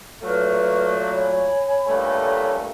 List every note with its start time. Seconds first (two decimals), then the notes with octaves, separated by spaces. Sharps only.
0.23 A#2 F#3 A3 B4 F6
1.09 C#5 G#5 B5
1.87 G2 A#2 A3